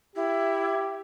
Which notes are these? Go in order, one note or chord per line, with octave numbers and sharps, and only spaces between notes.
E4 G4